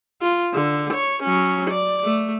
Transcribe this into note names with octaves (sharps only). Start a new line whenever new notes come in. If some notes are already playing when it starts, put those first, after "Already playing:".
F4
D3
C#5
F#3 C#4
D5
A3